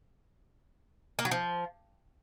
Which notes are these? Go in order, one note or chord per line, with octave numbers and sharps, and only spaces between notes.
A#3
F#3
F3